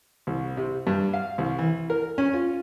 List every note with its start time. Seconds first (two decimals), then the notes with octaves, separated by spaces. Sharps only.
0.27 C2
0.57 C3
0.87 G2
1.14 F5
1.38 C2
1.59 E3
1.90 A#4
2.18 C#4
2.34 F4